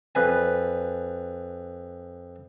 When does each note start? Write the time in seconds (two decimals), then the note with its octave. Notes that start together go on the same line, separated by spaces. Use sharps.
0.15 F2 B4 G#5